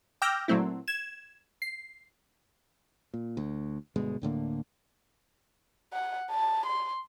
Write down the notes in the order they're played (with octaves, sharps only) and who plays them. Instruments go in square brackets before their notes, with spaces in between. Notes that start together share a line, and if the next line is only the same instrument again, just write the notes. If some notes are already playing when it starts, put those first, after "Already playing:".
[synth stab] G5 D6 E6 F6 G6 A#6
A#2 F#3 A3 C4 E4
G#6 E7
C7
[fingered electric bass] A#2
D2
G1 B2 G#3
D2 A2 D3 A#3
[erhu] F#5
A5
C6